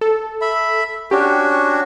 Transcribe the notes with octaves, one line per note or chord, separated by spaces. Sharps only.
A4
E5 B5
C#4 D4 F#4 G4